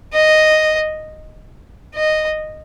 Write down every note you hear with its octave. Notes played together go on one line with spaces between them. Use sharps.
D#5
D#5